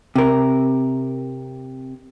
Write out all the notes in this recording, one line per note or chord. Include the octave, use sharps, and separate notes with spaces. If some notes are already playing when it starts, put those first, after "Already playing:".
C3 A#4